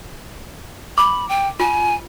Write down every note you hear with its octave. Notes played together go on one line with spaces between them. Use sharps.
B5 D6
G5
F4 G#5